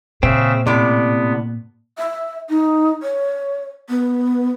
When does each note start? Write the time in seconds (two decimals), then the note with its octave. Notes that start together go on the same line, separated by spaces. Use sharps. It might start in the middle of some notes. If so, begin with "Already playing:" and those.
0.23 A#2 C#3 C4 E5
0.67 A2 C3 B3 D5
1.98 E5
2.49 D#4
3.02 C#5
3.89 B3